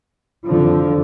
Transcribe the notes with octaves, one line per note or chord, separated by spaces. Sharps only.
F2 D3 F3